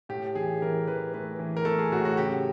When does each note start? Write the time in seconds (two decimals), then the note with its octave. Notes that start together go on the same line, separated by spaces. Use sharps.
0.09 A2 G4
0.35 E3 G#4
0.62 E3 A#4
0.87 E3 B4
1.13 A3 B4
1.39 E3
1.57 A#4
1.65 A3 A4
1.79 G#4
1.92 A2 F#4
2.05 F#4
2.17 C#3 G4